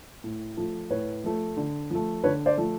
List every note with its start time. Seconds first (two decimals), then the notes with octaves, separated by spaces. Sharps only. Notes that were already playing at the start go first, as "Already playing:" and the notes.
0.24 A2
0.57 F3 A3
0.90 A2 B4 C#5
1.24 F3 A3
1.57 D3
1.90 F3 A3
2.24 D3 B4 C#5
2.46 C5 D5
2.57 F3 A3